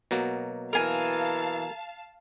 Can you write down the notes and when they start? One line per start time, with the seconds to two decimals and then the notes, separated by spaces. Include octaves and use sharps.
0.11 B2 F#3 A#3
0.73 E3 A#4 F5 G#5 A5